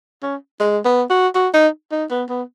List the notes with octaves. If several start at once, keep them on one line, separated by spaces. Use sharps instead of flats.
C#4
G#3
B3
F#4
F#4
D#4
D#4
B3
B3